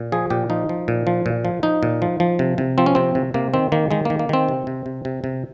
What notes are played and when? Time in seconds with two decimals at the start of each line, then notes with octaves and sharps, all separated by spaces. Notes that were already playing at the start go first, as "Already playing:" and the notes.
Already playing: A#2
0.12 F3 G#4
0.30 A#2 G4
0.50 F3 D#4
0.69 F3
0.88 A#2
1.07 F3
1.26 A#2
1.45 F3
1.63 F3 D#4
1.83 A#2
2.02 F3
2.20 F3
2.39 C3
2.58 C3
2.78 F3 C4
2.86 C#4
2.95 C3 C4
3.15 C3
3.34 C3 A#3
3.54 D#3 C4
3.72 D#3 A#3
3.91 D#3 G#3
4.05 D#3 A#3
4.19 A#3
4.29 D#3 C4
4.49 C3
4.67 C3
4.86 C3
5.05 C3
5.24 C3